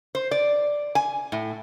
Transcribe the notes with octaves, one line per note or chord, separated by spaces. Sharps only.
C5
D5
G#5
A2